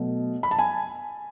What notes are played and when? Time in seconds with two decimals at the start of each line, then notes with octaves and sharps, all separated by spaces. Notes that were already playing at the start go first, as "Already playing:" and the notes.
Already playing: B2 F#3 A3
0.43 B5
0.51 A5
0.59 G#5